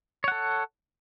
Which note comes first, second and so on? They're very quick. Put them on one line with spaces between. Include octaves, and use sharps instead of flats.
C#5 F#5 A4